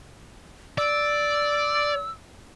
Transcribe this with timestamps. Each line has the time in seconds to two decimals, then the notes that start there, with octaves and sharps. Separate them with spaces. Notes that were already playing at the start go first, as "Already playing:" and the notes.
0.78 D5 E6